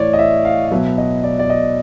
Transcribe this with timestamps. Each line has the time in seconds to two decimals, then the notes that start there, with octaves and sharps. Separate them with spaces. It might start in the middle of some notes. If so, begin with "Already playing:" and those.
Already playing: A2 E3 C#5 D5
0.13 D#5
0.19 E5
0.45 F5
0.66 F5
0.71 B2 F#3 E5
0.98 D#5
1.24 D5
1.39 D5
1.50 D#5